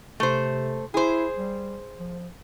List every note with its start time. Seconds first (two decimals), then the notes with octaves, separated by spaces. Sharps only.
0.20 C3 A3 C5
0.94 E4 G#4 C5
1.37 G3
2.00 F3